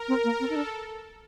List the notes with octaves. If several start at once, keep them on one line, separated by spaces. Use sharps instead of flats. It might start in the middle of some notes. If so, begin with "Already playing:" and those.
Already playing: A#4
C4
A#3
C4 A4
D#4
D4